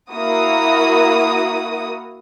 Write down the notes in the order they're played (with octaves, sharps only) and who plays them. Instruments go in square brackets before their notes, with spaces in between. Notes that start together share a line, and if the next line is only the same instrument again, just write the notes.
[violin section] A#3 E4 F#4 D#6